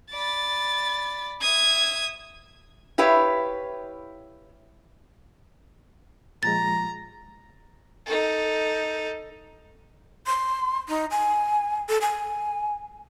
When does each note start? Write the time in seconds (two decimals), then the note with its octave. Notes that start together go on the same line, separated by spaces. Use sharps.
0.12 D5 B5 A6
1.42 E5 D#6 G#6
2.98 E4 G4 B4 C#5 F5
6.43 A#2 F3 G#3 A#5 A6
8.06 D#4 A4
10.27 C6
10.89 D#4
11.11 G#5
11.89 A4
12.01 G#5